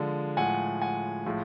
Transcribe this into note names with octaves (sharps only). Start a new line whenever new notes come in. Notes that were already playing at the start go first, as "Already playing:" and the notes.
Already playing: D3 F3 G#3
A2 F3 G#3 F#5 G#5
F#5 G#5
A2 F3 G#3